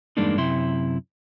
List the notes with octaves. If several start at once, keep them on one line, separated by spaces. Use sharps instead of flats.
E2 G2 G#3 A#3 D4 D#4
F#2 C3 E4 C6